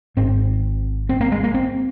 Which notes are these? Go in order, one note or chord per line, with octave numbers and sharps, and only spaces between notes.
G#1 G#2 C4
C4
A#3
G#3
A#3
C4